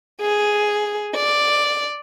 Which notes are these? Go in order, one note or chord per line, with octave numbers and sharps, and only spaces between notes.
G#4
D5